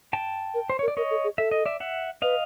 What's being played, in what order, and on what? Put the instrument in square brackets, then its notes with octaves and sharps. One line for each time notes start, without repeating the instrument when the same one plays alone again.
[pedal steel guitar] G5 A5
[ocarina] A#4
[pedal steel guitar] C5
[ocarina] A#4 [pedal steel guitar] C#5
[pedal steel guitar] D5
[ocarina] A#4 [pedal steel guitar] C#5 D#5
[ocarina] A4
G#4
[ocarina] A4 [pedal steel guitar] E5
[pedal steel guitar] D#5
D5 E5
E5 F#5
[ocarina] B4 [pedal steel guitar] D#5 F5